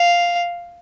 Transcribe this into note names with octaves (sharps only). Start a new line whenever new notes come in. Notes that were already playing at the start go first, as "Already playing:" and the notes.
Already playing: F5